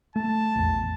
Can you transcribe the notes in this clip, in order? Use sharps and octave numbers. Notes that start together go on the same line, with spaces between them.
A3 A5
A#1 E2